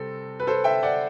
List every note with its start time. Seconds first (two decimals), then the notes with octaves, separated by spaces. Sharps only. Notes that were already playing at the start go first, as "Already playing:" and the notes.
Already playing: C3 G3 C4 A4
0.40 B4
0.47 A4 C5
0.64 E5 G5
0.83 D5 F#5